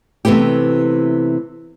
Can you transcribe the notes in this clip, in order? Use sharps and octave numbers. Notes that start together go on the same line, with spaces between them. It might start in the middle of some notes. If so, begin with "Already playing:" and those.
C3 E3 A3 B3 G4